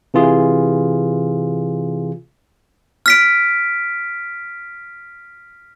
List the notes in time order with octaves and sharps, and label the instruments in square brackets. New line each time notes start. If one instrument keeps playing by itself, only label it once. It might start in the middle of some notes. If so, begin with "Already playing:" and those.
[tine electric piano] C3 E3 F4 G#4
[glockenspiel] F6 B6 D7